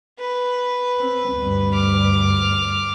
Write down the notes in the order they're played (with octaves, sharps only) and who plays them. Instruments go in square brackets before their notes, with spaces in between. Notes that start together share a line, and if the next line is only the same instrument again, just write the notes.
[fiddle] B4
[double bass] C4
D2 G2
[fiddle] D6 F6